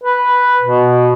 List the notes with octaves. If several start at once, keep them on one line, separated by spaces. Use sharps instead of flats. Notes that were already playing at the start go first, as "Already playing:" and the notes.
B4
B2